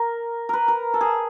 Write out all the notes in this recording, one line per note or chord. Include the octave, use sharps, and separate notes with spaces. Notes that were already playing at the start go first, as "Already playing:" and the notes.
Already playing: A#4
A#4 B4
A#4
A4
G#4